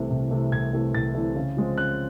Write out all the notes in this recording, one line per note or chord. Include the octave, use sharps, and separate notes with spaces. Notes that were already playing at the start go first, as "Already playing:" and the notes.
Already playing: C2 C3 E3 A3
C2
C3 E3 A3
C2 G#6
C3 E3 A3
C2 A6
C3 E3 A3
C#3
F3 G#3 C4
C#3 F#6